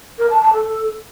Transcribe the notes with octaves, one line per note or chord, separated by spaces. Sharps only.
A#4
A5
A5
A4